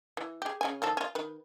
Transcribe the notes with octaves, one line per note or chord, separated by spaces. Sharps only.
E3
G4 G#4
C#3 C#4 G#5
D#3 F3 A4
C#4 F4
D#3 B4